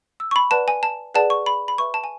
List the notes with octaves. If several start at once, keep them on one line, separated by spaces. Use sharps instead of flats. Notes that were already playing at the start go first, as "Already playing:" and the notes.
E6
C#6
B5
B4 D5 F#5 A5
G#5
A5
G#4 B4 D5 F#5 A5
C#6
B5
B5
B4 E5 C#6
A5
G#5